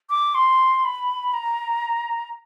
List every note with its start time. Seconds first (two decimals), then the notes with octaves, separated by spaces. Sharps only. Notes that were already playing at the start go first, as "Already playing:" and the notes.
0.10 D6
0.35 C6
0.85 B5
1.34 A#5